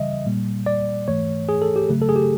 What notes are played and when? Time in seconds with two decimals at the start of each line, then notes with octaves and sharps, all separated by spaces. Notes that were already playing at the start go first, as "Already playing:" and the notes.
Already playing: C#3 E3 G3 D#5 E5
0.26 A#2 G3 A#3
0.66 D5
1.08 G#2 E3 A3 C#5
1.49 G#4
1.62 A4
1.76 G4
1.89 C#3 F#3 A3
2.02 A4
2.09 G#4
2.16 G4